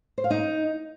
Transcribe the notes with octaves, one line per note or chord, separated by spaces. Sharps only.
C5
F5
D#4